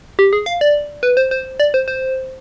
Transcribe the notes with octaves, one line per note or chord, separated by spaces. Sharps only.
G4
G#4
F5
D5
B4
C5
C5
D5
C5
C5